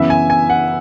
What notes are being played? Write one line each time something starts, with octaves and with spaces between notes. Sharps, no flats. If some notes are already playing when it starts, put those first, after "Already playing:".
Already playing: F#2 C#3 E3 B3 E5
G#5
G#5
F#5